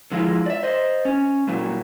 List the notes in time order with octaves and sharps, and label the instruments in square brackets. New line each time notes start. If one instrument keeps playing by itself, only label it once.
[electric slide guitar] D3 F3 G#3 E4 F4
D5 E5
C5 D#5
C#4
G2 A#2 E3 F#3